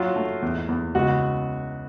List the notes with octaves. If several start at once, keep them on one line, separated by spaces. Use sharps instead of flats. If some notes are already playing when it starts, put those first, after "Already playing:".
Already playing: F#3 F4
A3
E2
E2
C#2 F#4